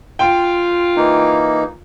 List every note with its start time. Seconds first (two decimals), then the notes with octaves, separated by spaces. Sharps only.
0.19 F4 G5
0.96 E3 A#3 D#4